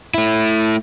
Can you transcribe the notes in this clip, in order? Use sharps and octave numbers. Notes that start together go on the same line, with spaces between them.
A3 E4